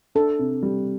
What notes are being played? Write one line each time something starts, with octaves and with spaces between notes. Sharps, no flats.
D4 A4
C3
G3